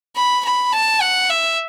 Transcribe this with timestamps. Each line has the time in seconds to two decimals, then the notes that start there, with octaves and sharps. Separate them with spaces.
0.16 B5
0.45 B5
0.73 A5
1.01 F#5
1.30 E5